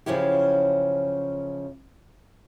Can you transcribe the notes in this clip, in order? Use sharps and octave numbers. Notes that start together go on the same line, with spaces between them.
F#2 C#3 F3 C#4 E4 G4